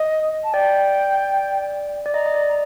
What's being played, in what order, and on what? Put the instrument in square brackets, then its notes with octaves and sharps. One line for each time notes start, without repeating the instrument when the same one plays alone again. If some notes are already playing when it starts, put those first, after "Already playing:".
Already playing: [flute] D#5
A5
[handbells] D5 [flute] G5
[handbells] D5
[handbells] D#5 [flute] A#5
[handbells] D#5
D5
[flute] A#5